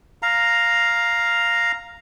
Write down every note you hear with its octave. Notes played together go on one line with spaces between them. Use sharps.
F5 A#5